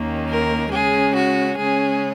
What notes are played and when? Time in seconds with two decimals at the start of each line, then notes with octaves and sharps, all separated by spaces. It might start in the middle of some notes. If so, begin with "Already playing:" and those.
Already playing: D#2 D#3 A#3 C#4
0.29 A#4
0.71 C#3 G#3 C#4 G#4
1.15 F#4
1.58 C#3 G#3 C#4 G#4